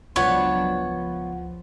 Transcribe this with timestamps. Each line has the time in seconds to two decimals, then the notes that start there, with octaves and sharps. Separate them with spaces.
0.16 C#2 F3 F#3 B3 D4 F4 C#5 F#5
0.79 F3